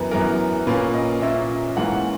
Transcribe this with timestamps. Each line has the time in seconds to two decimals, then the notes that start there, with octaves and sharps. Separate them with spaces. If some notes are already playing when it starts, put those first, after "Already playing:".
Already playing: F#2 E3 B3 A#4 B4
0.11 F#2 E3 B3 A#4
0.67 A#2 A#3 C#4 B4
0.94 D#5
1.22 A#2 A#3 C#4 E5
1.77 G#2 E3 A#3 C#4 F#5